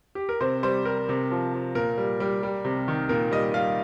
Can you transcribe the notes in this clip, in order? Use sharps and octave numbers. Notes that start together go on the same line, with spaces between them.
G4
A#4
C3 C5
G3 C5
G3 A#4
C3
F3
F3
A#2 A#4
G3
G3
G3
C3
D#3
A#2 A#4
G3 D#5
G3 F5